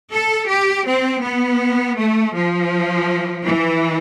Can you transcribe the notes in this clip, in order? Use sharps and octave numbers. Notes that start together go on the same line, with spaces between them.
A4
G4
C4
B3
A3
F3
E3